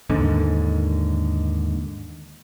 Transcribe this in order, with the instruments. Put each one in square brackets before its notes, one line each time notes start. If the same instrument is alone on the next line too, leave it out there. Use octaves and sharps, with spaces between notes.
[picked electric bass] D#2 G#2 D3